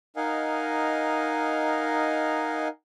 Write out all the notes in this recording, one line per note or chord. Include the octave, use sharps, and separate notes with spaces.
D#4 A#4 D#5 F5 F#5 G#5